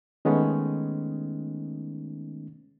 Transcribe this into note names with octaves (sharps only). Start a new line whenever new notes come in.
D#3 G#3 A3 B3 C#4 D#4